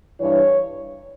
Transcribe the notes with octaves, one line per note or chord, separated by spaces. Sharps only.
G2 E3 C#5